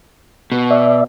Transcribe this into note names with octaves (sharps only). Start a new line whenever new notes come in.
B2
D5 E5